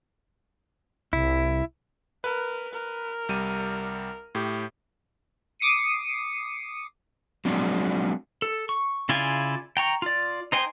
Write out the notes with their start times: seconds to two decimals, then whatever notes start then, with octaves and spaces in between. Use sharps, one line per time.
1.13 C2 E4
2.24 A#4 B4
2.73 A#4
3.29 C2 G3 D#7
4.35 A2 G4
5.59 D6 D#6 C7 C#7 D#7
7.45 F#3 G#3 C4 D4
8.42 A4
8.69 C#6
9.09 C#3 E4 F4 D5 G#5
9.77 G5 A#5 C#6
10.02 F4 D5
10.52 D#4 C5 G5 G#5 C6